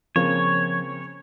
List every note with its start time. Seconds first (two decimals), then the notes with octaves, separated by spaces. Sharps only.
0.16 C#3 F3 A#3 C4 C#5